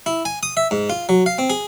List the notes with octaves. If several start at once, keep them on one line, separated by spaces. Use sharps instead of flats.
E4
G#5
D#6
E5
G#2
F4
F#3
F5
C4
G#4